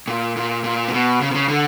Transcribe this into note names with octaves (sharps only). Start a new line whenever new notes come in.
A#2
A#2
A#2
C3
B2
C#3
C3
C#3
D3